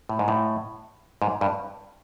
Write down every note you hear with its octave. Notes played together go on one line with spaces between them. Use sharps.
A2
G#2
A2
G#2
G2